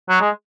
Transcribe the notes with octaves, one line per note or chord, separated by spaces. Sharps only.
F#3
G#3